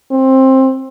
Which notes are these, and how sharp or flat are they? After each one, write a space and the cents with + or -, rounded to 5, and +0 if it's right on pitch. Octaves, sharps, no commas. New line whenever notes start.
C4 +15